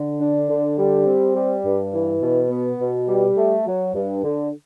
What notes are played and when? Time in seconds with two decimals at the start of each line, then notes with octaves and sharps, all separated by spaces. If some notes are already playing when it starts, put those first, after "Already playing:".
Already playing: D3
0.21 D4
0.49 D3
0.78 G3
1.06 C4
1.35 G3
1.65 G2
1.93 E3
2.23 B2
2.50 B3
2.80 B2
3.08 G3
3.37 A3
3.66 F#3
3.95 G2
4.24 D3